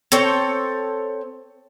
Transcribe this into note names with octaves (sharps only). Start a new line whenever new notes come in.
C4 A4 C#5 G5